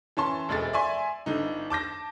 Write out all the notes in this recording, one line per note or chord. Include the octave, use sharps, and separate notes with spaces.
E3 C#4 A5 C6
E1 D2 G#3 A3 A6
D5 E5 G#5 C6
G1 D3 D#4
A5 D6 G6 A#6